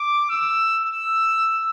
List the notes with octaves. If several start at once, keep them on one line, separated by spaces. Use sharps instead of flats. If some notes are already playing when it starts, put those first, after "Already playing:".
Already playing: D6
E6
E6